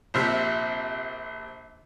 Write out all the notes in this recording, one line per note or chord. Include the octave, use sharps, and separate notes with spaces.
A#1 C3 E5